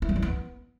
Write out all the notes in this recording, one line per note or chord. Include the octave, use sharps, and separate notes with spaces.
E4
G3
E4
B3